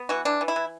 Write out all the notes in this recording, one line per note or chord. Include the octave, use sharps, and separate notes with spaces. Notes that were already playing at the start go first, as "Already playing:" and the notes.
Already playing: B3
E3 F#4
E3 D4
E3
E4
E3